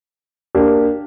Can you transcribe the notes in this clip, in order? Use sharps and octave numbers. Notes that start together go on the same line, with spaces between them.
A#3 D4 G4